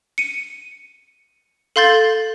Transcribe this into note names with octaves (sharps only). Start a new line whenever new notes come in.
C#7 D#7
A4 F5 C6 G6 A6